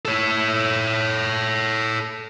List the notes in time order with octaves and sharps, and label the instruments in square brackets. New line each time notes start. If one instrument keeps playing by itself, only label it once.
[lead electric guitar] A4 C#5